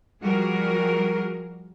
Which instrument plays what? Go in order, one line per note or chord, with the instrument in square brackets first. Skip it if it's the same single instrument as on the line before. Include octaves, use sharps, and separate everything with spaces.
[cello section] F3 G3 F#4 G#4 A#4